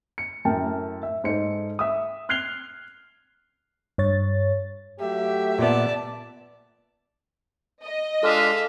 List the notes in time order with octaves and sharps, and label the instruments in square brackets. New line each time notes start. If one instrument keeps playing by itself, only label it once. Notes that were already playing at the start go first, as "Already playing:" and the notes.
[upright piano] C#7
F#2 A2 A#4 G5 A5
E5
G#2 A4 C5 C#7
E5 D#6
F6 F#6 G#6 C7 F7 G7
[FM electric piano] G2 C#5 A6
[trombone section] F#3 A3 G4 [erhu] E5
[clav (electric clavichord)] A#2 B3 [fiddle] D5 A5
[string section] D#5
[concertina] G#3 D4 F4 [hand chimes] A4 F6 [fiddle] E5 F5